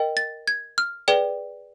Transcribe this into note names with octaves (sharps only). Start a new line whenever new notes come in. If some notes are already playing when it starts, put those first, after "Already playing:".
Already playing: A#4 D#5 G5
A6
G#6
F6
G#4 B4 D5 G5